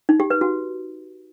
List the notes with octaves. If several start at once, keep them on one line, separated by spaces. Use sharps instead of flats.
D#4
G4
B4
F#4